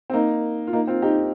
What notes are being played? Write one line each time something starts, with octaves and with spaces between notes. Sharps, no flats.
C4
A#3 D#4
F4
A#3 D#4
C4 F4
D#4 G4